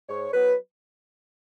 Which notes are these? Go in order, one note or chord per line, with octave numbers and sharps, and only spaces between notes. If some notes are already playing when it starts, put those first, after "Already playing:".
G#2 C#5
F#3 B3 B4